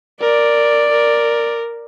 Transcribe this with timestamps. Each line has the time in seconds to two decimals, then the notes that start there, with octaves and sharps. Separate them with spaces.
0.21 A#4 D5
0.92 A#4